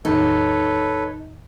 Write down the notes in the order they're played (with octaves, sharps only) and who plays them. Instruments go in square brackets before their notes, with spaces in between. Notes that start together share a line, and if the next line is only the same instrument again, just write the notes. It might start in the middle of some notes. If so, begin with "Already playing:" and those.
[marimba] E2 A2 D#3 [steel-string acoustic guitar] D#4 [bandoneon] A4 B4 C#5